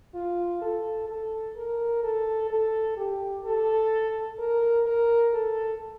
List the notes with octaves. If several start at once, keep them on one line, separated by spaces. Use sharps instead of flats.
F4
A4
A4
A#4
A4
A4
G4
A4
A#4
A#4
A4